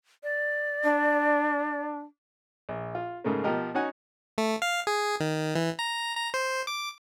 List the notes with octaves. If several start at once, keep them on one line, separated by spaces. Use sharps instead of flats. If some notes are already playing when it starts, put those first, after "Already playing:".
D5
D4
A#1
F4
G#2 C#3 A3 A#3
B2 F3 G4 A#4 D#5 F6
C#4 D#4 F#4 F#5 G#5
A3
F5
G#4
D#3
E3
A#5
A#5
C5
D6